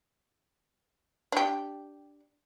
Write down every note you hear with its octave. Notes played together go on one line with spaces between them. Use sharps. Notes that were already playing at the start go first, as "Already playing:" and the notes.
D4 G4